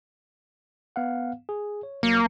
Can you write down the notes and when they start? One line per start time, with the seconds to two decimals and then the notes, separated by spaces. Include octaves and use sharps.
0.96 B3 F5 F#5
1.49 G#4
1.83 C#5
2.03 B1 F#3 A#3 C#7